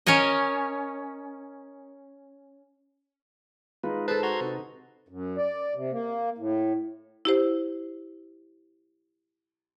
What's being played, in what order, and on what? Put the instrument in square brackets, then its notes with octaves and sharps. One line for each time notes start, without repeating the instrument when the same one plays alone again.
[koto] C#4 A#4 C#5 D#5
[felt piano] G#3 D#4 [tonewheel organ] F4 B4
[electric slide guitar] A4 C5 [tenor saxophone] B4 [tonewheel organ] A5
[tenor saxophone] F#4 [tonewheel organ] A#5 C6 G#6
[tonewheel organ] C3 [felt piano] D#4 B4
[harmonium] F#2
D5
C3
A#3
A2
[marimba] E4 G4 C5